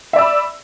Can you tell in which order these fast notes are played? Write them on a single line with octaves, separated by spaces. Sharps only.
E5 D5 E6 B5